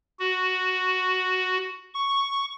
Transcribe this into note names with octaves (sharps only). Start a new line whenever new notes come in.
F#4
C#6